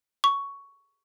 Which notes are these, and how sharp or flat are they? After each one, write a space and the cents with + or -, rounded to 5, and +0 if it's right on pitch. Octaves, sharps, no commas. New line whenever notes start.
C#6 +10